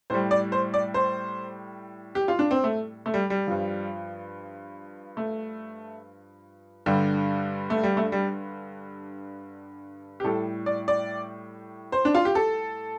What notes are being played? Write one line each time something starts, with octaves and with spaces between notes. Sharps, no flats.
A2 G3 C5
D5
C5
D5
C5
G4
F4
D4
C4
A3
A3
G3
G3
G2 F3
A3
G2 D3 G3
A3
G3
A3
G3
G4
A2 G3 A4
D5
D5
C5
D4
F4
G4
A4